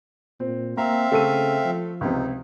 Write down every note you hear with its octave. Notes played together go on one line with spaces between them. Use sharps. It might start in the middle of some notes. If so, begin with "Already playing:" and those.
A#2 C4
A#3 C4 E5 F5 A#5
C#3 A3 A4 D#7
F3
C#2 C3 D#4